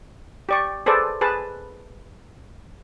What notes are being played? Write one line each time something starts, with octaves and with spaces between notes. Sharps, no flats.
G4 D5 C#6
G#4 A4 B4 C5 D5
G#4 B4 A5